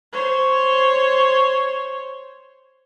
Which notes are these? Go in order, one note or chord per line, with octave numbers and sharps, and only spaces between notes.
C5 C#5